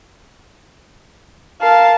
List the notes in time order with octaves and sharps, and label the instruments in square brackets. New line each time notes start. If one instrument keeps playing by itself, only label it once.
[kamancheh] A#4 A5 [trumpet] F5